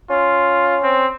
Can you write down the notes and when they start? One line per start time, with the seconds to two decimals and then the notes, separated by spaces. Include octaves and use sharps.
0.10 C#4 F4
0.83 C4